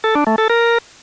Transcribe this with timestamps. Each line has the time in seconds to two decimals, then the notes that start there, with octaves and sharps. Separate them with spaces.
0.04 A4
0.15 D4
0.27 A3
0.38 A4
0.50 A#4